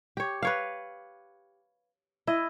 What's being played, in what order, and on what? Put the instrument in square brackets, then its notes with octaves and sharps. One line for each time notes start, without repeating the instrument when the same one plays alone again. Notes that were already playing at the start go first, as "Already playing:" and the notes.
[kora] G4 C#5
B4 C#5 F5
[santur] E4 [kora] D#5